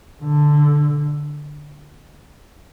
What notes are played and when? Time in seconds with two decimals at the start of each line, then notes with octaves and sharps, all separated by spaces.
0.24 D3